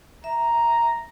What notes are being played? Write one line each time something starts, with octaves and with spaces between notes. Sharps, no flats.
E5 A#5